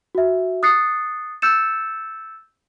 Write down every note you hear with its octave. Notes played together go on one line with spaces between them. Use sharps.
F#4 E5
D#6 F#6 A6 C7 C#7
E6 F#6 G6 A6 C#7 E7